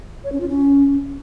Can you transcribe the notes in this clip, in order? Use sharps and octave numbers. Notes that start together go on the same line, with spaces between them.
C#5
C#4
F4
C#4